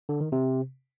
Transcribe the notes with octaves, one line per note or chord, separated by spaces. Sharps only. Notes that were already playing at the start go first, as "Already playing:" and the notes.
D3
D#3
C3